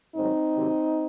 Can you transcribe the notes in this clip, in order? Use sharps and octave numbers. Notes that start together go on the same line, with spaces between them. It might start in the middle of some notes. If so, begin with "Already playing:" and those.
G#2 D#3 F#3 C4 D#4
C3 D#3 F#3